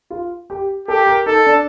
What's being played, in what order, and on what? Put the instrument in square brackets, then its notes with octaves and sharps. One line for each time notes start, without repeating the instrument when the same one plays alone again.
[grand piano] F4
G4
[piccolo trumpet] G4 [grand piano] A4
[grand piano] A#4
[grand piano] D#4 [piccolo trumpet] A4
[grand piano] D4